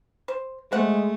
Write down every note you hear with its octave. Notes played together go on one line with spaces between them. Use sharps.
C5
G#3 A3 C5 F#5